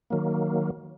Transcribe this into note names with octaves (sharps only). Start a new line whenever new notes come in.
D#3 F#3 A#3